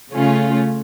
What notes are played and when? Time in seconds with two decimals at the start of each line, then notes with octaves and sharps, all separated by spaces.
0.11 C#3 A3 C#4 F4